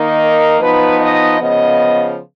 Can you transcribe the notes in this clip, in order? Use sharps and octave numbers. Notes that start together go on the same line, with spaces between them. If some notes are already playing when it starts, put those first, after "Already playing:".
Already playing: D#3 A#3 D#4
A#4
F3 B3 D#4 B4
D#5
C#3 F3 B3 D#5